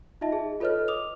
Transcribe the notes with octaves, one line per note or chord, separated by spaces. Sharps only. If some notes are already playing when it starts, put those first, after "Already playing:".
D#4 F4 D#5 E5 A5
G#4
F4 A4 B4 C#5 D#5 F6
D6 D#6 F7